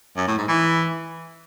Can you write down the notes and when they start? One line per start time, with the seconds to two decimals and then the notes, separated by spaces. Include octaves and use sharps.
0.17 F#2
0.27 A2
0.38 G#2
0.48 E3